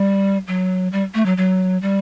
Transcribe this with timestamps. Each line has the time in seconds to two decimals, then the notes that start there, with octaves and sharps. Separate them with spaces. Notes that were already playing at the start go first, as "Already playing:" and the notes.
Already playing: G3
0.47 F#3
0.92 G3
1.14 A3
1.26 F#3
1.37 F#3
1.82 G3